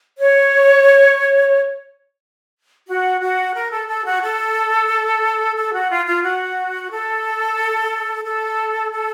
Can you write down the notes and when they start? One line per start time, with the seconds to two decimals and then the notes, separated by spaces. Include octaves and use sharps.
0.19 C#5
2.88 F#4
3.20 F#4
3.54 A#4
3.70 A4
3.88 A4
4.05 F#4
4.22 A4
5.55 A4
5.73 F#4
5.89 F4
6.06 F4
6.23 F#4
6.91 A4
8.25 A4
8.92 A4